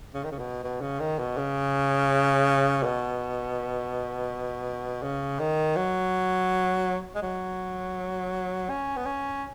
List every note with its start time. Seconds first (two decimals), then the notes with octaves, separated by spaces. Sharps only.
0.14 C#3
0.24 D#3
0.31 C#3
0.39 B2
0.63 B2
0.81 C#3
0.99 D#3
1.19 B2
1.37 C#3
2.83 B2
5.03 C#3
5.39 D#3
5.76 F#3
7.15 G#3
7.22 F#3
8.69 C#4
8.96 B3
9.05 C#4